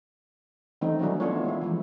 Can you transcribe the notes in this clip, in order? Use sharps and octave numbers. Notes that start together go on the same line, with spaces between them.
D#3 E3 G3 A3 C4 D#4
F#3 A3 C#4 D4 E4 F#4
B3 C4 D4 F4 A4 C#5
G#3 E4
E3 F3 G#3